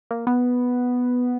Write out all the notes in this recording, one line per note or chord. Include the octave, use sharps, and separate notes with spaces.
A#3
B3